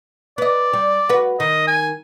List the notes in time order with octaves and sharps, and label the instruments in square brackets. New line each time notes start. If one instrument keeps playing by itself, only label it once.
[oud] B4 D#5 [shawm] D5
[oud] G3
F#4 B4
[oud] D#3 [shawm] D#5
[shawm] G#5